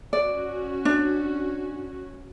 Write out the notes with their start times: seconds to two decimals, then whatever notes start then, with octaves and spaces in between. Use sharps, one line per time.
0.13 C#4 F#4 D5
0.85 D4